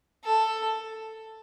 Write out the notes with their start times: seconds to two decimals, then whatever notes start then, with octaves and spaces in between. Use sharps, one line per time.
0.24 A4